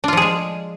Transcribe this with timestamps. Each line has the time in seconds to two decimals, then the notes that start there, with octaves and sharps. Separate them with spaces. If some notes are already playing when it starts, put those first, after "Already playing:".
0.04 D4
0.08 F4
0.13 F3
0.17 G#4
0.22 G#3